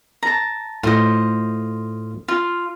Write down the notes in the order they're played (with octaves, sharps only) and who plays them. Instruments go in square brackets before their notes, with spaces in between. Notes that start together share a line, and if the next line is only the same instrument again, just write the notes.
[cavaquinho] A5 A#5
[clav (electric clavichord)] A2 [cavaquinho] F4 C5 D#5
[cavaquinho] F4